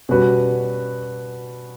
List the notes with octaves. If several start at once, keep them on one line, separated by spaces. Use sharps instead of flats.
B2 G3 C#4 F#4 B4